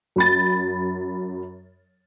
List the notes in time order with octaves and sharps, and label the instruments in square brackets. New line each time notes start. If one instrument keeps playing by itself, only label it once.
[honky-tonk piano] F#2 B5 A6